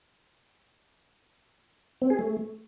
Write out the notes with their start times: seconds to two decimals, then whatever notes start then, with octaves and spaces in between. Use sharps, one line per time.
2.02 C4
2.10 G#4
2.19 A3